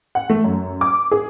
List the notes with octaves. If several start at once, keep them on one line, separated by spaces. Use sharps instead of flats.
F#5
A3
F#2
D6
G#4